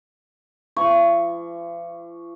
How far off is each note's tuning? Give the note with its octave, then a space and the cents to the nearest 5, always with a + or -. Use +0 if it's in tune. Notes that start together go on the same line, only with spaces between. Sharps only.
F3 -45 C#6 +0